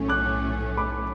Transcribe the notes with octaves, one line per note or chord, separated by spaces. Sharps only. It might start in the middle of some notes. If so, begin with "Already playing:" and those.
Already playing: B1 A2 F#3 A3 C#4
D6 F#6
B5 D6